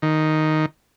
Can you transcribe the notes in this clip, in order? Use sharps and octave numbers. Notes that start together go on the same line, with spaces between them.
D#3